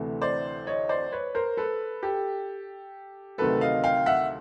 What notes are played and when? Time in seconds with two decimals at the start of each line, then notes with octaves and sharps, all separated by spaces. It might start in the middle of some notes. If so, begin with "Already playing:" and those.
Already playing: D2 C3 E3 A3
0.22 C5 D5
0.67 C#5 D#5
0.89 C5 D5
1.12 B4 C#5
1.35 A#4 C5
1.57 A4 B4
2.03 G4 A4
3.38 D2 C3 D#3 F#3 A3 A4 B4
3.61 D#5 F5
3.84 F5 G5
4.06 E5 F#5